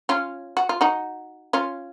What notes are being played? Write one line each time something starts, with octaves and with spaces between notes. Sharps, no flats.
C#4 F4
F#4
F4
D#4 F#4
C#4 F4